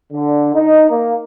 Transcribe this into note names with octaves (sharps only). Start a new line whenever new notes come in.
D3
D#4
A#3